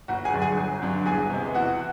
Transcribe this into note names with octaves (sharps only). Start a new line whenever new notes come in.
G1 F#4 F#5
G#4 G#5
G2 D3 F#3
G#4 G#5
G1
G2 D3 F#3
E2 G#4 G#5
C3 E3 G#3 B3
E2 F#4 F#5